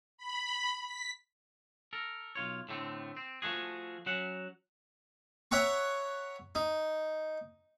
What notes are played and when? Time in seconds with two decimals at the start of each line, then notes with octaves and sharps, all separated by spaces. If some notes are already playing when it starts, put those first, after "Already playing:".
0.18 B5
0.82 B6
1.93 A4 A#4
2.35 B1 F4 C#5
2.69 A2 D3 A3 C4
3.17 C4
3.42 F3 A3 F#4 G#4
4.06 F#3 C#4 F#5
5.51 C#5 E5 F#5 A#5 C#6
6.55 D#4